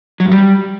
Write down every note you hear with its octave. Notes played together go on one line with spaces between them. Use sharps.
F#3
G2
G3